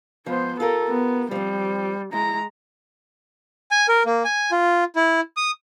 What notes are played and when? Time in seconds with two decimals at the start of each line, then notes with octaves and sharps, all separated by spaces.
0.26 G#2 F3 B3 C5
0.60 F4 G4 A4 A#4
0.88 B3
1.31 F3 G3 C4
2.13 G#3 E4 A#5
3.71 G#5
3.88 A#4
4.05 A#3
4.24 G#5
4.51 F4
4.96 E4
5.37 D#6